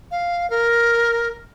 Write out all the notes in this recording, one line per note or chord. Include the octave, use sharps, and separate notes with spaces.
F5
A#4